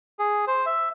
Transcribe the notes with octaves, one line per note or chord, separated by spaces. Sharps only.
G#4
C5
E5